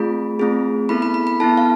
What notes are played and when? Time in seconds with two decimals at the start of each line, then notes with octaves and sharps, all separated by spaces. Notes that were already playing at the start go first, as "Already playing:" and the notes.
Already playing: A3 C4 F4 G#4 B5
0.39 A3 C4 F4 G#4
0.89 B3 E4 A4 B5
1.02 B5
1.14 B5
1.27 B5
1.40 B3 E4 A4 A5
1.57 F5